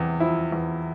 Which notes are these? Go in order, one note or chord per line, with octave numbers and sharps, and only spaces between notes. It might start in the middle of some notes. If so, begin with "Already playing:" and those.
Already playing: E2 C3
F3 E4
E2